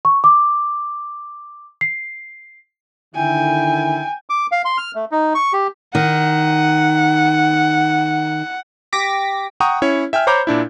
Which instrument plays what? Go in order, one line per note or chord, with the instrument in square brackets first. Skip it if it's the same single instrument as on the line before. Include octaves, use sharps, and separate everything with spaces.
[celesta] C#6
D6
C7
[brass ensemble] D3 D#3 E4 [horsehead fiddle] G5 G#5
[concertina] D6
F5
C6
F6
A3
D#4
C#6
G4
[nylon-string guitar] D#3 [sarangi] F#5
[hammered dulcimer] G4 [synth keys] D6 A#6 B6
[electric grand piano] F#5 G5 A#5 C#6 D#6
C#4 E4 C#5
E5 G5 G#5 F6
C5 C#5 A#5 B5 D6 G6
A#2 D4 E4